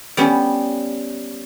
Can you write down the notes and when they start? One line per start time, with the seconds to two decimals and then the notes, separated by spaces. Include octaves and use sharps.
0.17 G3 B3 C#4